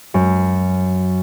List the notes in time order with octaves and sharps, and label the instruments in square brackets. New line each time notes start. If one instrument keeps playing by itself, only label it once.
[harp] F#2